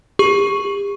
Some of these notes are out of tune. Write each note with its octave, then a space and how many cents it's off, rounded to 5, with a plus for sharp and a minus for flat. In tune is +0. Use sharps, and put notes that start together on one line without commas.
G4 +45 C#6 +0